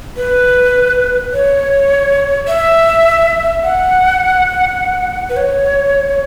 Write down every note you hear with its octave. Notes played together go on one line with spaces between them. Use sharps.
B4
C#5
E5
F#5
B4
C#5